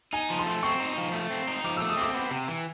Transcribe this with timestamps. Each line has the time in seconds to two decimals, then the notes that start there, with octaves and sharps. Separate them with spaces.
0.13 D#4 G#5
0.30 F3
0.39 C6
0.46 A3
0.63 C4 C#6
0.80 D#4
0.97 F3
1.13 A3
1.31 C4
1.47 D#4
1.64 F3 D6
1.77 E6
1.81 A3
1.90 D#6
1.97 C4 D6
2.14 B3
2.31 C3
2.48 E3